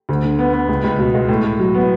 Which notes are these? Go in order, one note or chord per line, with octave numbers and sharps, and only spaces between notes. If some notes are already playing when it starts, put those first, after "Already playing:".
D2
D3
B3
B3
C#2
C#2
B2
G#3
A2
A2
F#3
B3